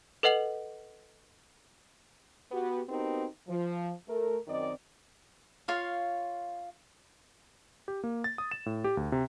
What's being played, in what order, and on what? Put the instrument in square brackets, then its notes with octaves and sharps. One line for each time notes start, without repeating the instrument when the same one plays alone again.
[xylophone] A4 B4 D#5 F#5 F7 F#7
[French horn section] B3 F#4 G4
B3 C4 D#4 F#4 G4 A#4
F3
A3 A#4
F#2 D#3 C4 D5 D#5
[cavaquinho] F4 C#5 F5
[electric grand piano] G4
A#3
A6
D#6
E7
A2
G4
D2
C3